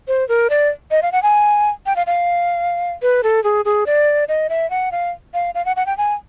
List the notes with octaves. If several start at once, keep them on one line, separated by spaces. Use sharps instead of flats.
C5
A#4
D5
D#5
F5
F#5
G#5
G5
F5
F5
B4
A4
G#4
G#4
D5
D#5
E5
F#5
F5
F5
F5
F#5
F#5
G5
G#5